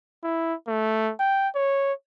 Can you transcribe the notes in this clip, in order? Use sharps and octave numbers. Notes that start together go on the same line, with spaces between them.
E4
A3
G5
C#5